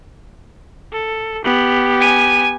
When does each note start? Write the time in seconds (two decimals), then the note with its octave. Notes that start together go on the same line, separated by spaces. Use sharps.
0.93 A4
1.44 B3 G4
2.01 G#5 D#7